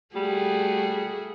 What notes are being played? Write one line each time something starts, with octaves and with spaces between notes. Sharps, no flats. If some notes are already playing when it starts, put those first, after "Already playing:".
G3 A3 F#4 G#4